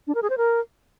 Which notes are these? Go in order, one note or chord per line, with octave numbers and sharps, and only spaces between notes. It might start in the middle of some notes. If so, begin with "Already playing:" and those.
D4
A#4
G#4
C5
A#4